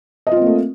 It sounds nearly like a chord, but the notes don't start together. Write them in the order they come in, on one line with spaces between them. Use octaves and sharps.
D#5 F4 C4 A#3 A3